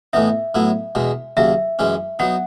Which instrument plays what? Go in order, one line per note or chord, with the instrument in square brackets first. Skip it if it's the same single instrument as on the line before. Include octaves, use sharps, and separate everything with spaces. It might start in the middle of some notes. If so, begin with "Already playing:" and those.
[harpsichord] A2 E3 B3 D#4 [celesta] E5
[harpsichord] A2 F#3 B3 E4
E2 B2 G#3
[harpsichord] D#2 C#3 F#3 [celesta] E5
[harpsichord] F#2 E3 G#3 C#4
[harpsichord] F#3 B3 D#4 [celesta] F#5